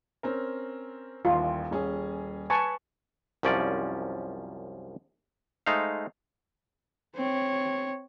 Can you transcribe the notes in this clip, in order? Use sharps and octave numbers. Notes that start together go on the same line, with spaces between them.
C4 C#4 A#4
D#1 A1 D#2 F4
D#1 C#4 G#4
B4 G#5 A5 C#6
C2 F#2 F3 C#4 D5
G#3 A3 D#4 C5 F5
C4 C#5